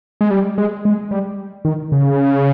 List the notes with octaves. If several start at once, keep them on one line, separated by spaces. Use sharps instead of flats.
G#3
G3
G#3
G#3
G3
D#3
C#3